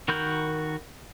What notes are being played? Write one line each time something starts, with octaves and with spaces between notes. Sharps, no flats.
D#3 F#4 A#4 B5 G6